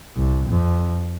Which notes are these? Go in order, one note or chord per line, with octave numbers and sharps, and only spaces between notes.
C2
F2